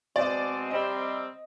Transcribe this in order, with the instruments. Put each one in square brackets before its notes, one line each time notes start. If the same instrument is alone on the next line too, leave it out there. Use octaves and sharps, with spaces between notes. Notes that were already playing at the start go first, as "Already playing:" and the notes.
[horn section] B2 G#3 C4 [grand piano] D5
[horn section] C3 G3 C4 [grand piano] D#5